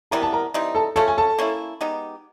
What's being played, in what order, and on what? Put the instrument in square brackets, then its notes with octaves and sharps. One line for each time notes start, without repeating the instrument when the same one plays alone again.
[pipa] C3 E3 G3 B3 [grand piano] A#4 A#5
[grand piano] A5
A#4 A#5
[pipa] E3 G3 C4 D#4
[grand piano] A4 A5
[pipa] C#3 F3 A3 C#4 [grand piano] A4 A5
[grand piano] G#5
A4 A5
[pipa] A#3 C#4 E4
G#3 B3 D#4 G4